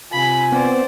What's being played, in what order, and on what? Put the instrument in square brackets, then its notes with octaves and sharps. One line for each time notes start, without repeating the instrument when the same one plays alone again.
[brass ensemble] C3 F4 G#5 [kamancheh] B5
[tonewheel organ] B3 C4 [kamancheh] C5 D5